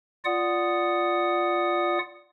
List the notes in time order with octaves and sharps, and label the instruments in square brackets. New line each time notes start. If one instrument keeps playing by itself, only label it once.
[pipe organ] F4 D5 F#5 D#6